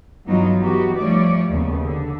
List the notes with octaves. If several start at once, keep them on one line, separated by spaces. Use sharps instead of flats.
G2 E3 F#3 B3 D#4 F4
E3 B3 D#4 F#4 G4
F3 G3 A3 C#5 D5
D#2 C#3 B3
D3